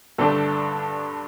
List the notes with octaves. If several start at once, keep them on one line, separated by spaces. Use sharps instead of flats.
G2 D3 A3 D4 A4